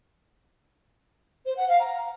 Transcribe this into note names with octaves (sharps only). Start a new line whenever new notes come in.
C5
F#5
F5
A#5